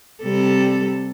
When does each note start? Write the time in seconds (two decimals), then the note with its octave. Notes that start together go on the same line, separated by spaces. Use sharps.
0.22 C3 G3 A4